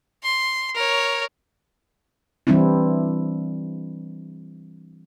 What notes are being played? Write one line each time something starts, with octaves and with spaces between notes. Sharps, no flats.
C6
A#4 C#5
E3 G3 C4 D4 E4